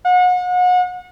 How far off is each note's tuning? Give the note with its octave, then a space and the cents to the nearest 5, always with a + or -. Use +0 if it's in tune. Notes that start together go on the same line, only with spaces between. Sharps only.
F#5 -35